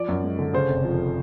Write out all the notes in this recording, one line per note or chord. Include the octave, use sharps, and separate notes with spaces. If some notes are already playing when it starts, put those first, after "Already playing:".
Already playing: F3 D5
F#2
G#3
D3
C#3 C5
F1
F3